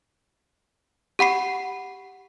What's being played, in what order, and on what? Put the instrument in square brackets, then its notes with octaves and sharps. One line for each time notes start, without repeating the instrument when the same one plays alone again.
[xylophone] G4 F#5 B5 C7